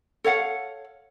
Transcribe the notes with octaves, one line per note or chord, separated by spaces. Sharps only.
A4 C#5 F5 F#5